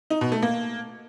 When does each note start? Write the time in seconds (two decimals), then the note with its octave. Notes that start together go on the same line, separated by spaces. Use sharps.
0.10 D#4
0.21 B2
0.32 A3
0.42 A#3